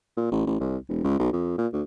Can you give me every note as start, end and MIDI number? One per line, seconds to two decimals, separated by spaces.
0.17 0.30 46
0.32 0.44 33
0.47 0.58 33
0.60 0.77 36
0.89 1.03 28
1.04 1.19 37
1.19 1.30 35
1.33 1.56 41
1.58 1.67 46
1.73 1.82 38